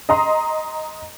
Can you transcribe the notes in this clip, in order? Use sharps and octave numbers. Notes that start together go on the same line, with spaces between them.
D#5 A#5 C6